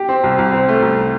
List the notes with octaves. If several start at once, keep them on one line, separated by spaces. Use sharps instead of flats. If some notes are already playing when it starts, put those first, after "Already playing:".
Already playing: G4
C4
C2
C2
C4
A3
C2